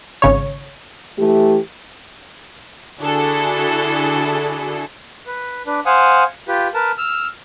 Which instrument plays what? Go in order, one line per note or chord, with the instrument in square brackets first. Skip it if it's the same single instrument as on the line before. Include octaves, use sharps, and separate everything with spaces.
[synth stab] G#1 C#3 C#5
[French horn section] E3 A3 G4
[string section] D3 D4 E4 F#4 G#4 A4
[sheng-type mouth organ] B4
D4 B4
C5 F5 F#5 G#5 D#6
F4 G4 B4
A#4 B4 A5
E6 F6